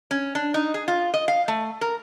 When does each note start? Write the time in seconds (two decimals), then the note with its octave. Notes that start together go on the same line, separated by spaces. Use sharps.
0.11 C#4
0.35 D4
0.54 D#4
0.74 G#4
0.88 F4
1.14 D#5
1.28 F5
1.48 A3
1.81 A#4